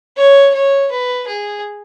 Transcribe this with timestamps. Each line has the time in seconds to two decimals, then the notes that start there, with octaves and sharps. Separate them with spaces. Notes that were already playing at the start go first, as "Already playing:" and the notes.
0.17 C#5
0.54 C#5
0.91 B4
1.27 G#4